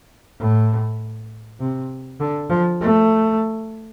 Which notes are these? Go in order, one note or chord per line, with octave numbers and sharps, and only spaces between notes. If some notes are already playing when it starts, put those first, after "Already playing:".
A2
C3
D3
F3
A3